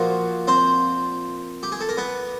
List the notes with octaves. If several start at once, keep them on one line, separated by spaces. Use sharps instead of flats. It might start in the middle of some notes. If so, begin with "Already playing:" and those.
Already playing: A#2 F3 A#3 F#4
C4 C5
G4
G#4
A4
A#4
B3 B4